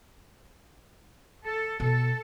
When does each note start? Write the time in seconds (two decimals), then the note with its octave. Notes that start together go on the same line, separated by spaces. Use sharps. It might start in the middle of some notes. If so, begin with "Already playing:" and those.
1.45 A4
1.80 B2 A4